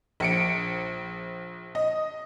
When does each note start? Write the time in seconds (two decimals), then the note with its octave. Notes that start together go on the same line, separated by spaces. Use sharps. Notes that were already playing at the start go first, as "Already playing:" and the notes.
0.20 A#1 C#7 D7
1.75 D#5